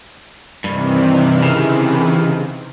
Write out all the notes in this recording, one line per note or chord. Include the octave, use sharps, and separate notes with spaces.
G2 C3 D#3 E3
C#3